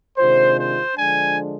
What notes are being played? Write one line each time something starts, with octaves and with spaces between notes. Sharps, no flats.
C3 D#3 G#3 D4 F4 C5
C5
D3 F3 G#3 D4 G#5